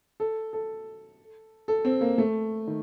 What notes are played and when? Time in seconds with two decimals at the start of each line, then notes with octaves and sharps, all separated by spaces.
0.20 A4
0.53 A4
1.68 A4
1.85 C4
2.01 A#3
2.18 A3
2.67 D#3